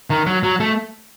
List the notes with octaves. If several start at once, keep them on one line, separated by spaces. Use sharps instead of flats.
D#3
F#3
F#3
A3